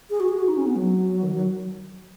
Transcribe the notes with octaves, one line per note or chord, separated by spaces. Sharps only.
G#4
F#4
G#4
F#4
D#4
C#4
B3
F#3
D#3
F#3